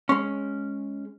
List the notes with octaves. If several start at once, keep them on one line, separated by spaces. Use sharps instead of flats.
G#3 C#4